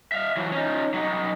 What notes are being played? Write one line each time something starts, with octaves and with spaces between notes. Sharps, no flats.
E5 F5
E3 F#3
C#4 D#4
F#3 D#4